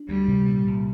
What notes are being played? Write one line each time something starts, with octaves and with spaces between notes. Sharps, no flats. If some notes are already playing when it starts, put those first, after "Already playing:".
Already playing: D4
D2 G3
C3
A#2
C2